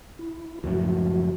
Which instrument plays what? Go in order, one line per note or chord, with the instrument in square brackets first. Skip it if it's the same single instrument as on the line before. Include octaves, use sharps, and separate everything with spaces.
[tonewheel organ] E4
[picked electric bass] C#2 F#2 A2 [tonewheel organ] F3 F#4